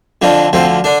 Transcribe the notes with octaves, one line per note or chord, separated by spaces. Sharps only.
F2 D3 F3 D4
D2 D3 F3 C4
D3 D4